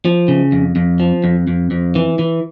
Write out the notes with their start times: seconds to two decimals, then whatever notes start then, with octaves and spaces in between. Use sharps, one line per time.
0.05 F3
0.28 C#3
0.52 F2
0.76 F2
1.00 F3
1.24 F2
1.48 F2
1.71 F2
1.95 E3
2.19 E3